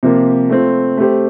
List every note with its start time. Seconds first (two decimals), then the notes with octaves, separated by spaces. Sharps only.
0.03 C3 F3 A#3 F4
0.49 A3 C4 F4
0.97 A3 C4 G4 C5